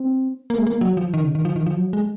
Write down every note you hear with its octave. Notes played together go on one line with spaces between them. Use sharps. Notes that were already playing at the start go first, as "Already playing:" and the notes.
Already playing: C4
A#3
G#3
A#3
F#3
F3
D#3
C#3
D#3
F3
D#3
F3
F#3
G#3